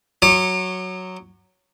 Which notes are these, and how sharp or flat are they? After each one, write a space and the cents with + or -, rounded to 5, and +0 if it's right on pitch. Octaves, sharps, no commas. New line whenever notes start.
F#3 +0 C#5 +0 D6 +40